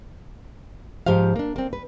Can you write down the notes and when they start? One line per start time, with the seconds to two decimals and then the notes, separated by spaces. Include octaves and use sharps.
1.06 G#2 F3 G4 C5 F5
1.36 A#3 D4
1.56 A#3 C4
1.73 B4